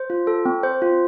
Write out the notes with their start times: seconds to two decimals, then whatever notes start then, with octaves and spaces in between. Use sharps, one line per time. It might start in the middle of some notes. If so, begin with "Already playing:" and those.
Already playing: C5
0.10 F4
0.27 A4
0.45 C4
0.63 C5
0.82 F4